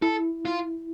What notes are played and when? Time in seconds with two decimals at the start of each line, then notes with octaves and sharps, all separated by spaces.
0.02 E4 A4
0.45 F4